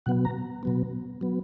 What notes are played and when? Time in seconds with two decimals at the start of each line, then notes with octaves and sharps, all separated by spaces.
0.06 B2 F#3 B3 F#5
0.25 A#5
0.63 B2 F#3 B3
1.21 F#3 B3